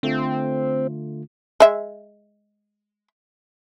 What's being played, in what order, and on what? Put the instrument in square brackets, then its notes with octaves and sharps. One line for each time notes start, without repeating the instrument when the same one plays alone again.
[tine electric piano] D3 A3 F4 [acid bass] C4
[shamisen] G#3 E5